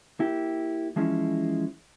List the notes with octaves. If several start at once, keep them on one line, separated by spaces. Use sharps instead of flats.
A#3 E4 G4
E3 F3 G#3 C#4 E4